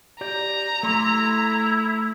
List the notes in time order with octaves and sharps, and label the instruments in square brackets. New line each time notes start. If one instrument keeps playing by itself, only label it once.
[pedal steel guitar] G4 D5 G6 [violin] A#5
[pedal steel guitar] A3 C6 D6 [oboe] E4